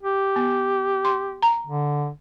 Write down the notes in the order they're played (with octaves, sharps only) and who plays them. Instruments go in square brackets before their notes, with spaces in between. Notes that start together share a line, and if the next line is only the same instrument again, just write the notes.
[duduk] G4
[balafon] B3
C6
A#5
[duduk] D3